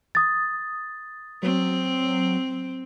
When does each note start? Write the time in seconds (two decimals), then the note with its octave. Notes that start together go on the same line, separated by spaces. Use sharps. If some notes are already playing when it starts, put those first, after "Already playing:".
0.15 D#6 A6
1.43 F#3 C4